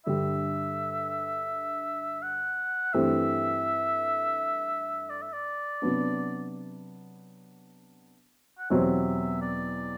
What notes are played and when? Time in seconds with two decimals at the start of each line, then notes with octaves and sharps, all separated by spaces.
0.06 G2 D3 G3 E5
2.22 F#5
2.93 G2 E3 A3 C4 G4 E5
5.10 D5
5.22 E5
5.33 D5
5.82 C3 F#3 B3 D4
8.59 F#5
8.70 E2 B2 F#3 C4 G4 E5
9.42 D5